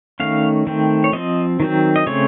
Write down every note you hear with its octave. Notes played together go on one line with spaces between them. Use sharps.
D#3 A3 C#4 F5
D#3 A3 C4
C#5
F3 C4 D#5
D#3 F#3 C4
D#5
C#3 A3 C4 C#5